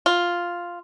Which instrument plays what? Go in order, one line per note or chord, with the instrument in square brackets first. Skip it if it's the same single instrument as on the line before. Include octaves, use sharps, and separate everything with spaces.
[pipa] F4